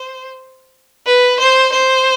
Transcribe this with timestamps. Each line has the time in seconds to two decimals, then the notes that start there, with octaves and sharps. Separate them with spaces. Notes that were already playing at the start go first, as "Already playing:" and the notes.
Already playing: C5
1.06 B4
1.40 C5
1.73 C5